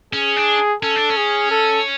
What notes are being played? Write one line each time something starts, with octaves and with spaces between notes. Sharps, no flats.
C#4 G#4
D4
C#4 A4
D4
C#4
G#4
A4